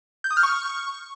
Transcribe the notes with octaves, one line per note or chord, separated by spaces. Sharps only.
G6
D#6
F6
C#6